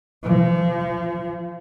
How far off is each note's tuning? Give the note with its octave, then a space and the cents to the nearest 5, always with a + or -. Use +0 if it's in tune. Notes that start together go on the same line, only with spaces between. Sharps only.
F3 -35